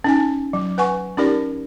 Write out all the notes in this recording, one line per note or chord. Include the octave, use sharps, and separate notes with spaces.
C#4 D#4 G#5
F#3
B4 F#5 G#5 C#6
C#4 D#4 G4 A#4 D5